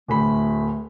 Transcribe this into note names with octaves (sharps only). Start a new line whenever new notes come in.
D1 D2 A3 B5